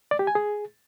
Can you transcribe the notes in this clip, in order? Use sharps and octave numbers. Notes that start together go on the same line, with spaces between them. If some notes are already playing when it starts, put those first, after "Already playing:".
D5
G4
G#5
G#4